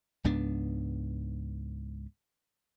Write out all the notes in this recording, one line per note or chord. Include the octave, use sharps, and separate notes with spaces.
C#2 G#2 B3 D4